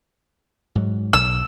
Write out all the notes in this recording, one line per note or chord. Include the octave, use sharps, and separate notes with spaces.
G#2 F#3
B1 E6